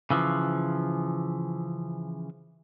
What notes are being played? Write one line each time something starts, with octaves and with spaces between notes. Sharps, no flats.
C#3 E3 F3